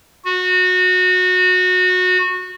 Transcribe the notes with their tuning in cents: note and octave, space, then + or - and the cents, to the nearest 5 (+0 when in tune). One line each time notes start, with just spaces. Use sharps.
F#4 -20